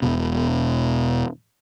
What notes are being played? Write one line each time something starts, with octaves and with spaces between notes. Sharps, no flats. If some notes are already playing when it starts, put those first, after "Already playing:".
E1 B2